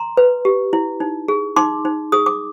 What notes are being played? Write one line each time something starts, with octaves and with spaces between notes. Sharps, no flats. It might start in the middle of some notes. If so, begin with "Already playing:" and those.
Already playing: A#5 C6
B4
G4
E4
D#4
G#4
D#4 C6 D6
D#4
G#4 D#6
D6